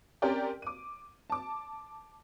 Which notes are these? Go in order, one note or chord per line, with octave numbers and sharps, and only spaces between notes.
C4 C#4 G4 A#4 D5 G5
D6 D#7
A5 D6